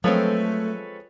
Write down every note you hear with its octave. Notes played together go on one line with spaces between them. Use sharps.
F3 F#3 G#3 A3 C4 A4 B4 C#5